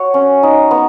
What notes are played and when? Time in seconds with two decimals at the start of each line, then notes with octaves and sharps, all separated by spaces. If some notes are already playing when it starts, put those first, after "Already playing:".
Already playing: F#4 C#5
0.14 C#4
0.43 D#4
0.71 B3